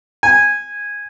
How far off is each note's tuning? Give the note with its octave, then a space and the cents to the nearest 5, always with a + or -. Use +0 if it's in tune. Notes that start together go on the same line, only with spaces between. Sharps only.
G#5 -10